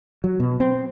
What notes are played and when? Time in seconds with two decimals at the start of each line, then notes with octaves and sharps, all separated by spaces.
0.24 F#3
0.40 B2
0.60 C4